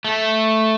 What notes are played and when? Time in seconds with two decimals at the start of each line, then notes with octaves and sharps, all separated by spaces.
0.05 A3